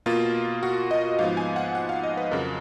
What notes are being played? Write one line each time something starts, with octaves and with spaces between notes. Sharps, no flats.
B2 A#3 F4
F#4
D#5
G#2 F3 B3 F5
G#5
F#5
F#5
F5
D#5
B4
F2 C#3 F#3 A#4